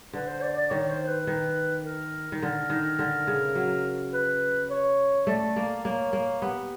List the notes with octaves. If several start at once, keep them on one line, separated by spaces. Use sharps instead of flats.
D3 B4
C5
D5
D5
D#3 C#5
C5
B4
D#3
A#4
D#3
D3 A#4
D#3
D3
C#3
F#3
B4
C#5
A3 D5
A#3
A#3 C#5
A#3
B3 G4